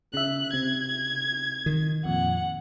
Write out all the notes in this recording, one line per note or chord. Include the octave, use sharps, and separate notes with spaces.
C#3 E5 F#6
C3 G#6
D#3
F2 A#2 F#5